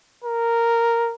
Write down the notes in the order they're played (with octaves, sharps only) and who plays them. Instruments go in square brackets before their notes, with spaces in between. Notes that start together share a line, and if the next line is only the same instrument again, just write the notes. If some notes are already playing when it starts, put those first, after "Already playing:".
[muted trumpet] A#4